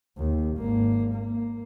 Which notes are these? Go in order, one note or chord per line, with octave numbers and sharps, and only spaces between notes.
D#2
G#1 A#3
A#3